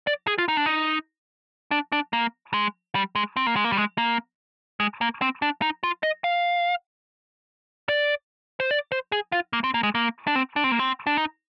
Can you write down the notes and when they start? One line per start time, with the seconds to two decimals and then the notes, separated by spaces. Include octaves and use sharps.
0.07 D5
0.27 G#4
0.38 F4
0.48 D#4
0.57 D4
0.66 D#4
1.71 D4
1.92 D4
2.13 A#3
2.54 G#3
2.95 G3
3.15 G#3
3.37 C4
3.47 A#3
3.56 G#3
3.65 A#3
3.72 G3
3.77 G#3
3.98 A#3
4.80 G#3
5.01 A#3
5.22 C4
5.42 D4
5.62 D#4
5.83 F4
6.03 D#5
6.24 F5
7.89 D5
8.60 C5
8.71 D5
8.92 C5
9.12 G#4
9.32 F4
9.53 A#3
9.64 C4
9.74 A#3
9.83 G#3
9.95 A#3
10.27 D4
10.35 C4
10.56 D4
10.64 C4
10.72 A#3
10.79 C4
11.07 D4
11.17 D#4